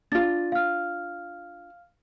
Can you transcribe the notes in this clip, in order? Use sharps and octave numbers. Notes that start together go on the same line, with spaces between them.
D4 F4 A6
F5 F6